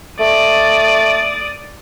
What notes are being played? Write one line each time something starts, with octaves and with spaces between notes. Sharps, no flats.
A3 D5 D#6